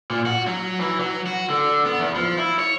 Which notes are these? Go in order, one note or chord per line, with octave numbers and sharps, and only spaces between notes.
A#2
F#4
F#3
E3
F#3
F#4
D3
B3
E2
F3
E4
C#5